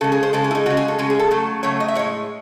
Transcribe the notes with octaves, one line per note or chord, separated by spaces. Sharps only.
C#3 G#3 A4
G#4
C5
C#3 G#3 A4
G#4
E4
D#4
C#3 G#3 F#4
G#4
A4
C#3 G#3 G#4
G#4
A4
C#3 F#3 A3
C#3 F#3 A3 C#5
D#5
E5
A2 G#3 C#5